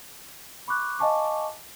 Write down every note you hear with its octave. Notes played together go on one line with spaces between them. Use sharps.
B5 C#6 D6 F#6
D#5 F5 G#5 A5 C#6 D6